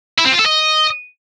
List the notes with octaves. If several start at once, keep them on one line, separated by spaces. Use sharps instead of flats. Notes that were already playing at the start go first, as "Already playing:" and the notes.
E4
C4
F4
A4
D#5